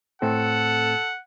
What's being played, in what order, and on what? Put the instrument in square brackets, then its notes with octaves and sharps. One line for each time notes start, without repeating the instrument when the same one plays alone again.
[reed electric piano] A2 A3 C4 [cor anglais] A4 [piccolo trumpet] F#5